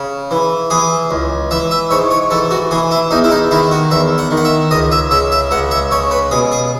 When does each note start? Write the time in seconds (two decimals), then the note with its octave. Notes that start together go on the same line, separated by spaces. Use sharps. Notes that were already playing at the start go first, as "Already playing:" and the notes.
Already playing: C#3
0.31 E3
0.70 E3 G#4
1.11 C#2
1.51 E3 E5
1.71 E5
1.91 G#2 C#5
2.11 C#5
2.31 E3 A4
2.51 F#4
2.71 E3 G#4
2.91 E4
3.11 E2 D#4
3.24 E4
3.31 D#4
3.51 D#3 E4
3.71 F#4
3.91 E2 E5
4.18 F#5
4.31 D#3
4.37 F#5
4.45 E5
4.71 C#2 D#5
4.92 E5
5.11 C#3 E5
5.32 E5
5.51 C#2 F#5
5.71 E5
5.91 C#3 C#5
6.11 B4
6.31 B2 G#4
6.52 G#4